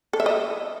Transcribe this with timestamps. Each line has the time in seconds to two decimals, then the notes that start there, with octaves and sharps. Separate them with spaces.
0.13 A4
0.20 E5
0.26 D#5